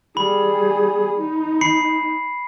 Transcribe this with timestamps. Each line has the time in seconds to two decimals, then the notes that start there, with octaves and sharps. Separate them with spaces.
0.17 G3 G#4 B5
1.18 D#4
1.61 B5 C7 C#7